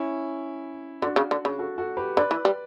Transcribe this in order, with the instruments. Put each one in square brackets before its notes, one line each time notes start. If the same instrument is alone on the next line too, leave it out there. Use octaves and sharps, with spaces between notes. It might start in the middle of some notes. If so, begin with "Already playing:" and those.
Already playing: [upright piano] C#4 E4
[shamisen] D3 [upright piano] D4 F#4
[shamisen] C#3
D3
C#3
[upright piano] F#4 A4
F#4 A4
G4 B4
[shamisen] D3 [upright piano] B4 D5
[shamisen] E3
G3